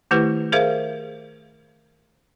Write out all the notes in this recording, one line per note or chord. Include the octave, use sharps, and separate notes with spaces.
D#3 A3 E4 G4 B4
G#4 A#4 C5 E5 F5